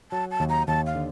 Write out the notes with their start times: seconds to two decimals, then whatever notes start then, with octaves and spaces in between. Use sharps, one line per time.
0.12 F#3 A5
0.31 A5
0.40 D#2
0.50 A#5
0.68 D#2 A5
0.86 F5
0.95 D3